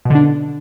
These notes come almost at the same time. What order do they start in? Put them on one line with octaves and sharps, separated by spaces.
B2 D3 D4